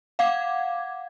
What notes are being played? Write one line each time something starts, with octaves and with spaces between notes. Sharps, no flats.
F5 F#5 D6 G#6